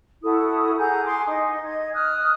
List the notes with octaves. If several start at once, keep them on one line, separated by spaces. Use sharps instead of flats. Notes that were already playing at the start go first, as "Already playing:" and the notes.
E4 F#4 A4 D#6
G#4 F#5 A#5 G6
G#5 C6 D6 D#6
D#4 D#5
D#5 G#6
D#6 F6 F#6